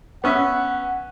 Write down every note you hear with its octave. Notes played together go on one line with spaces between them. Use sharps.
B3 C#4 E5 F#5